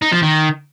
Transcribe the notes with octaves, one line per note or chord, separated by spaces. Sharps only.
D#4
F3
D#3